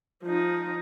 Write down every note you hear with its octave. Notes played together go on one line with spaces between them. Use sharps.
F3 D#4